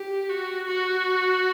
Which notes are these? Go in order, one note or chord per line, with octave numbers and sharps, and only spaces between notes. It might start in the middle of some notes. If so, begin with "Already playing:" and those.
Already playing: G4
F#4
F#4